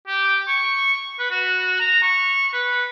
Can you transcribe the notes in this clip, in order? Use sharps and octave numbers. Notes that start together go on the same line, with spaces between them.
G4
C#6
B4
F#4
A#5
C#6
B4